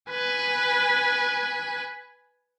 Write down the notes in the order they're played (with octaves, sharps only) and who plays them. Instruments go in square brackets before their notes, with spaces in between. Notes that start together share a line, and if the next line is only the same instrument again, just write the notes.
[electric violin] B4 G#5